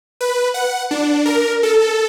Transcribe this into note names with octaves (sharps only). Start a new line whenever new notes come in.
B4
F#5
D4
A#4
A4